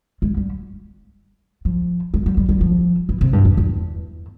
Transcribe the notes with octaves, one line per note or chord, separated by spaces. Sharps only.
G#3
G3
F3
G#3
G3
G3
G3
F3
E3
C3
G2
E2
E2